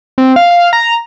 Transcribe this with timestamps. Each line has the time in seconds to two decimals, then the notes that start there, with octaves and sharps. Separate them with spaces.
0.18 C4
0.36 F5
0.51 F5
0.73 A#5